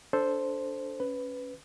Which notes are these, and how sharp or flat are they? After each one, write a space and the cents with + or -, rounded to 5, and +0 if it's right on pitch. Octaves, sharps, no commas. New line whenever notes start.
D4 -20 A4 +0 C5 +0
C#4 +0 B4 +10